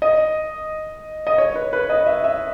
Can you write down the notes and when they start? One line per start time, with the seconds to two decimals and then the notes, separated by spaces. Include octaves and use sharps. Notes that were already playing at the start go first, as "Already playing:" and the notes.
0.02 D#5
1.27 D#5
1.38 C#5
1.55 B4
1.73 B4
1.89 D#5
2.07 E5
2.24 E5